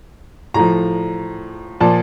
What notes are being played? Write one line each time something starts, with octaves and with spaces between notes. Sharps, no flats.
A2 F3 A#5
A#2 F3 A5